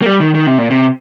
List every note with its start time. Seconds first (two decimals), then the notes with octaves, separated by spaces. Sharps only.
0.02 A#3
0.06 G3
0.20 D#3
0.35 D#3
0.47 C3
0.58 A#2
0.70 C3